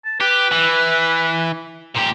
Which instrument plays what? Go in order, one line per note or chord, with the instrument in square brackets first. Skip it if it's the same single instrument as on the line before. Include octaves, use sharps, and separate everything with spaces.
[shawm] A5
[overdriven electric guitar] G4 [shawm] B4
[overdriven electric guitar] E3
A#2 G4